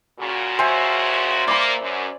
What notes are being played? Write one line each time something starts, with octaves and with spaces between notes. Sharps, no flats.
A#2 C#3 F#4
C5 E5 G#5
A#2 A#3 D5 B5
F#2